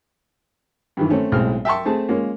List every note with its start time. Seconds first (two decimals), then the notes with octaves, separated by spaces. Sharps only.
0.97 G2 D#3 E3
1.10 A3 C4 C#4
1.32 B1 A2 G#3 C4 F6
1.65 E5 G5 A5 C6 C#6
1.85 A3 C4 G#4 A5
2.09 G#3 A#3 C#4 F4